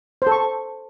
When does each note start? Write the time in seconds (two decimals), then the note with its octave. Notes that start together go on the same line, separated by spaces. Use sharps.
0.22 C5
0.27 A4
0.32 C#6